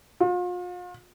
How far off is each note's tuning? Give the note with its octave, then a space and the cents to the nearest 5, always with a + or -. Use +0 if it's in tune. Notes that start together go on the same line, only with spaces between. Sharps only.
F4 +40